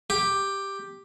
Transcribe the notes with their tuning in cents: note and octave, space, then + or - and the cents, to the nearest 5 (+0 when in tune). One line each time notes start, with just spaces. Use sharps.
G4 +5